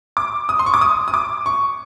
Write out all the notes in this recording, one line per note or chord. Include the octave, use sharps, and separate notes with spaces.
D6
D#6
C6
C#6
D6
D#6
D#6
D6
C#6